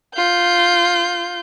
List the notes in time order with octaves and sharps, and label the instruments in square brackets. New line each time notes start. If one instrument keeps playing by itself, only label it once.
[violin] F4 G6